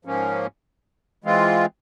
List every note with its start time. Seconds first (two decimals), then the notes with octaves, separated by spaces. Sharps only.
0.05 G#2 F3 A#3 C#4
1.24 E3 G#3 C4 F4